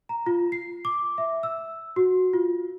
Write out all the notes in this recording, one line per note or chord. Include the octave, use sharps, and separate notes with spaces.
A#5
F4
C7
D6
E5
E6
F#4
F4